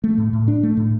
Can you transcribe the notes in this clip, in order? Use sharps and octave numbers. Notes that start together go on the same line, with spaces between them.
A3
A2
A2
D4
A3
A2